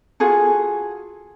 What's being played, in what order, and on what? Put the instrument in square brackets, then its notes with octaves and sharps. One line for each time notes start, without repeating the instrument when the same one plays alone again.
[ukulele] F4 F#4 G#4 A4